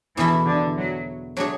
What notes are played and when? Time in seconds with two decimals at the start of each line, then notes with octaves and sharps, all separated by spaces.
0.17 E2 B2 E3 A3 E4 A4
0.46 D3
0.76 F#3
1.37 F#3 A3 D4 G#4 C#5